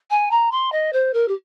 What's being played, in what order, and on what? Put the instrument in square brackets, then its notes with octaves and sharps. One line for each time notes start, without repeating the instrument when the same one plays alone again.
[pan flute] G#5
A#5
C6
D#5
C5
A#4
G4